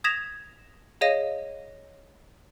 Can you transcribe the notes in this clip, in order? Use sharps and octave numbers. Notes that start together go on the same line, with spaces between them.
D#6 G#6 A#6 B6 E7 F7
G#4 C#5 D#5 F5 A#6 D#7